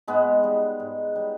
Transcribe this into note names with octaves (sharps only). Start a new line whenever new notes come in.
G#2 G#3 B3
G3
G#2
G3